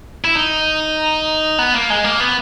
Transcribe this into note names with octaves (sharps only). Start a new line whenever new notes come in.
E4
D#4
B3
A#3
G#3
A#3
B3